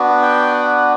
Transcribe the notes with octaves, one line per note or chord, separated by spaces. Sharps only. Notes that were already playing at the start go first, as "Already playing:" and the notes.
Already playing: B3 D4 F#4
G5
F#5